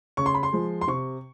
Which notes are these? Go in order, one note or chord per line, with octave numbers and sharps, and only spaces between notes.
C#3 C#6
C6
B5
C6
F3 G#3
C6
C3 C#6